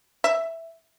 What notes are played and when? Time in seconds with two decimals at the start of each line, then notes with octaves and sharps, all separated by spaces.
0.24 E5